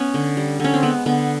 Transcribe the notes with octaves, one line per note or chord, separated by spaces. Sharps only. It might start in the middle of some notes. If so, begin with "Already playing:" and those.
Already playing: B3 C#4
D3
G3
D3 C#4
C4
G#3 B3
D3 B3